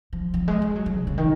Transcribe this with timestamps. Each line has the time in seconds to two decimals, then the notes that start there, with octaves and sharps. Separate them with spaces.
0.13 F3
0.34 F3
0.48 G#3
0.62 G#3
0.76 F#3
0.86 F#3
0.97 C3
1.07 C#3
1.18 D#3